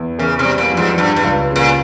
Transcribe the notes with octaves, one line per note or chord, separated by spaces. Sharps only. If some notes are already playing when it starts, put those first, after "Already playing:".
Already playing: E2
C#3 E3
C3
G3
A#2
F2
G#2
G2 G3
G2
C#2
C#3
A#2